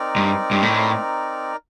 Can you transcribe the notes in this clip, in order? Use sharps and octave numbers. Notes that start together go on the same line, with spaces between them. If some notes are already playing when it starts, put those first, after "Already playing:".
Already playing: C4 D#4 A#4 D5
G2
G2
A2